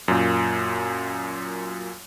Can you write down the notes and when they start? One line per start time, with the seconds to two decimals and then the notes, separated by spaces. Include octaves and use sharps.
0.08 F#2 A#2